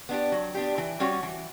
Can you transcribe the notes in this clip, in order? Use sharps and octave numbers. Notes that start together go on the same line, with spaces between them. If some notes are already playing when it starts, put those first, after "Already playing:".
B3 D4 G4
F#3
B3 D4 G4
E3
G3 C#4 F#4 C#5
E3